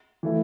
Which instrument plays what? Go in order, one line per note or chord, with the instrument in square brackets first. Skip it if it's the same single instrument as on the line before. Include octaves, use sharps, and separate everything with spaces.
[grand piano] E3 A3 E4